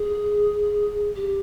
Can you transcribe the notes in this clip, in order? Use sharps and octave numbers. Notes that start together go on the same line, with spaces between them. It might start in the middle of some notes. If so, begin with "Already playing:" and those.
Already playing: G#4
G4